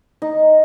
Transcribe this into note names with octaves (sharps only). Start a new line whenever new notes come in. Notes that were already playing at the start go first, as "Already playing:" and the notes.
D#4